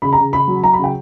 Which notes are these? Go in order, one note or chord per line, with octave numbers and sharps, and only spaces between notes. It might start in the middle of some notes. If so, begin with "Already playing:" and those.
C#3 B5
A#5
C#3
C#3 B5
F#3
F#3 A#5
B5
C#3 G5